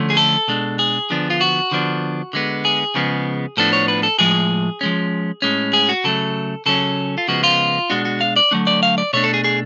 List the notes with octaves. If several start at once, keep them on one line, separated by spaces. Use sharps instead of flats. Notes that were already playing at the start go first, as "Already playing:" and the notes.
Already playing: D3 F3 A3 C#4
G#4
A4
B2 G#3 D4
G#4
D3 F3 B3 D4
F4
F#4
D3 F3 B3 D4
D3 G#3 B3
G#4
C#3 F3 G#3 B3
A2 F3 B3 D4 A4
C#5
B4
A4
A2 F3 G#3 G#4
F3 G#3 C#4
A2 G#3 C#4
G#4
F#4
C#3 F#3 A3 A4
C#3 F#3 C#4 A4
F4
C#3 F3 G#3 B3 F#4
F4
B2 G#3 D4 F#4
F#4
F5
D5
D3 F#3 A3 D4
D5
F5
D5
B2 A3 D4 C#5
A4
G#4
G#4